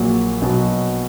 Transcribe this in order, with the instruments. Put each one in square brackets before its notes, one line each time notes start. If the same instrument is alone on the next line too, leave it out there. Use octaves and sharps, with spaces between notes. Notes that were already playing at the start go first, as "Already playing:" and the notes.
Already playing: [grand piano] A#1 A#2 F#3
B1 B2 F#3